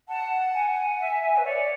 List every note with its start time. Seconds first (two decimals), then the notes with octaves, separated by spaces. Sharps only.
0.08 F#5 A5
0.54 G#5
0.99 E5
1.22 E5
1.36 B4 E5
1.44 C#5 D5